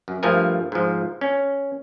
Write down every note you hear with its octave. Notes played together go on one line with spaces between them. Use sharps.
F#2
G2 F3 A3 A#4 G#5
G#2 F3
C#4